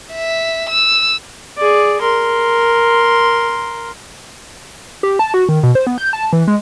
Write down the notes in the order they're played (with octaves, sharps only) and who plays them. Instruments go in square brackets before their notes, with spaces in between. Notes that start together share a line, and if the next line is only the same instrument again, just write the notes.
[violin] E5
E6
[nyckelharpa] G#4 D5
A#4 C6
[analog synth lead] G4
A5
F#4
D#3
B2
C5
B3
G6
A5
E3
G#3